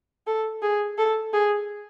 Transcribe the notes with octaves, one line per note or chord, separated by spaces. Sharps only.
A4
G#4
A4
G#4